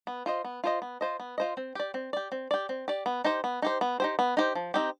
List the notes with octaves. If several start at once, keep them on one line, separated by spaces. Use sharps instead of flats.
B3
F4 C5 D#5
B3
F4 C5 D#5
B3
F4 C5 D#5
B3
F4 C5 D#5
C4
G4 D5
C4
G4 D5
C4
G4 D5
C4
G4 D5
B3
D#4 G4 C5
B3
D#4 G4 C5
B3
D#4 G4 C5
B3
D#4 G4 C5
F3
C4 D#4 G4